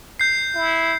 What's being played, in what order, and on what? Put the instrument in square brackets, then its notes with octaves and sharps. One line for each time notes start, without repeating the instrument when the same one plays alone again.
[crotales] G6 C7
[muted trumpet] E4